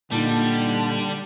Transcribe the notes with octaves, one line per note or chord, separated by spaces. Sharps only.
A#2 D3 G3 D#4 A5